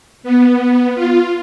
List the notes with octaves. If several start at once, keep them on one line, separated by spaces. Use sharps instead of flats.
B3
F4